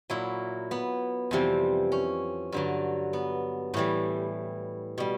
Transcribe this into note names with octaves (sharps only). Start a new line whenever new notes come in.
A#2 F#3 E4
B3
F2 C3 E3 G3
C#4
G2 D3 F#3
B3
A2 E3 G3
B2 G3